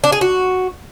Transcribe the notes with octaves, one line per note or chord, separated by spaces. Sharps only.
D4
G#4
F#4